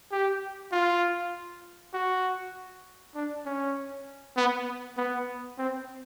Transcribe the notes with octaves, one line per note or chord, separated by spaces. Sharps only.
G4
F4
F#4
D4
C#4
B3
B3
C4